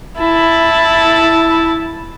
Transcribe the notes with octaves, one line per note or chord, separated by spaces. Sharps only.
E4 A5